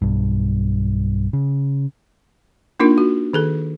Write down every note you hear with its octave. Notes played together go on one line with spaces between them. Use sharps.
B1 G2
C#3
A#3 D4 D#4 F4 A#4
F#4
D#3 G#4 A4